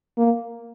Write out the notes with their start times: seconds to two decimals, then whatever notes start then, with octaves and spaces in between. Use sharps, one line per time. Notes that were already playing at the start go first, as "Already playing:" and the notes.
0.18 A#3